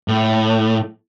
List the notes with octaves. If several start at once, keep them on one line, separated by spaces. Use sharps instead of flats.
A2